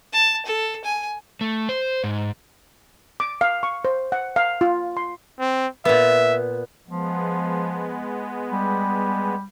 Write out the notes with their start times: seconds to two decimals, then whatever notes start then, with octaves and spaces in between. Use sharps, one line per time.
0.13 A5
0.46 A4
0.85 G#5
1.41 A3
1.69 C5
2.04 G#2
3.20 D6
3.41 F5
3.63 C#6
3.85 C5
4.12 F#5
4.36 F5
4.61 F4
4.97 C6
5.39 C4
5.85 A#2 B3 E5
6.88 F3 G#3 B3
8.52 G3